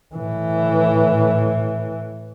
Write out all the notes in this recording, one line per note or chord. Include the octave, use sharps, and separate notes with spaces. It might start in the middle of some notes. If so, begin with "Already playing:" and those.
A2 E3